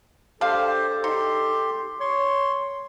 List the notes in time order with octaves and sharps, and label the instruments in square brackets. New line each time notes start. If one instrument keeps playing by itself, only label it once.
[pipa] D4 F5 [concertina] G4 C5 [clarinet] A4
[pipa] D#4 [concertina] G4 C6
[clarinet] C#5 [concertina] C6